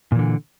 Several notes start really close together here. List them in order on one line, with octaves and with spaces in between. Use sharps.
A#2 E3 D3